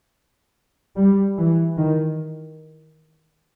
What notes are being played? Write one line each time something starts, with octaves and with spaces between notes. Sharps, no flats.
G3
E3
D#3